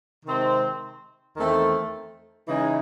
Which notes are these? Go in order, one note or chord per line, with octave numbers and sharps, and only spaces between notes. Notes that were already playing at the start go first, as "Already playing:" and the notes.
C3 D#3 G#3 C4
E2 D#3 A3 C4
C#3 E3 G#3 D#4